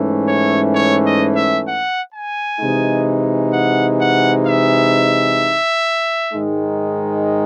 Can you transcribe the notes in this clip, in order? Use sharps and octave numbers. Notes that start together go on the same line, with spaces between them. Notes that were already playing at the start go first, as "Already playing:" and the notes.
Already playing: G#2 E3 A3 C#4
C#5
C#5
D#5
E5
F#5
G#5
C3 E3 G#3 D#4
F#5
F#5
E5
G#2 D#3 G#3 D#4